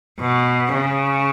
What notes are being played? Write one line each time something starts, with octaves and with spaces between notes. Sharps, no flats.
B2
C#3